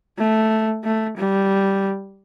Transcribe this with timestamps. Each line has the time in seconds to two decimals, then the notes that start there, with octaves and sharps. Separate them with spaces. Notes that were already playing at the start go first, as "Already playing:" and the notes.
0.18 A3
0.84 A3
1.17 G3